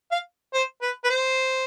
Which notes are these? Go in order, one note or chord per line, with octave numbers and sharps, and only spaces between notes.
F5
C5
B4
B4
C5